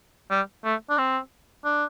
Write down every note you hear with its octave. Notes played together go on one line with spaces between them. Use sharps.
G3
A3
D4
C4
D4